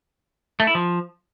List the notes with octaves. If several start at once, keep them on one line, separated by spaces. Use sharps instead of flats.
A3
E4
F3